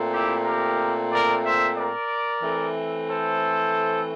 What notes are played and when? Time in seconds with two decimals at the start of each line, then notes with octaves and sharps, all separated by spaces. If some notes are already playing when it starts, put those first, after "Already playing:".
Already playing: A#2 A3 C4
0.12 E4 G4
0.45 G4 A#4
1.12 A#4 D5
1.44 C5 E5
1.77 A#4 D5
2.43 E3 A3 C4
3.09 A4 C5